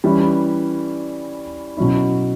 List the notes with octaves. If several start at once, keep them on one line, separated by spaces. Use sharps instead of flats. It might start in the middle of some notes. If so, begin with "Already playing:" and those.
E3 G3 C#4 E4
B2 F#3 C#4 E4